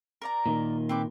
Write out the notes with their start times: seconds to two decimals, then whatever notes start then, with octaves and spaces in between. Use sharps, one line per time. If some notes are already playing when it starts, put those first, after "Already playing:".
0.22 A#4 D5 A#5
0.46 A#2 D#3
0.89 C4 B4 D6